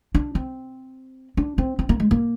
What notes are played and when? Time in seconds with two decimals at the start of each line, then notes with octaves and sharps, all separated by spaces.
0.14 D4
0.35 C4
1.37 D4
1.58 C4
1.79 C4
1.89 A#3
2.00 G#3
2.11 A#3